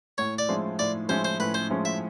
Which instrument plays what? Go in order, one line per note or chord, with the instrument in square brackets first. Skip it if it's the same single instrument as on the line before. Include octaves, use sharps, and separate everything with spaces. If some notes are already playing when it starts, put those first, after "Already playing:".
[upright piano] A2 [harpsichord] C#5
[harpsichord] D5
[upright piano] F3 G#3 C#4 E4
[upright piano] A2 [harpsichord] D5
[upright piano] F3 G#3 C#4 E4 [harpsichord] C5
[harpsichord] C5
[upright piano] A2 [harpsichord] B4
[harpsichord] C5
[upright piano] F3 G#3 C#4 E4
[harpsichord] E5